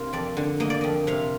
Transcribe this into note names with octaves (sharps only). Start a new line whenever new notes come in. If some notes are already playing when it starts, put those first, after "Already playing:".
Already playing: C3 A#3 D4 F4
F2 D5
D3
A#3 D#5
D5
F2 D#5
C3 F5